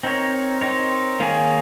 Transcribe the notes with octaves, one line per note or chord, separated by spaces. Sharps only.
C4 D#4 A#4 C#5
C4 D#4 A#4 C#5
D#3 A#3 D#4 G#4 C#5